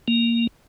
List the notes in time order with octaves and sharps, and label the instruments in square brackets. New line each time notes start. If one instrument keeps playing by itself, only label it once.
[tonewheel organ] A#3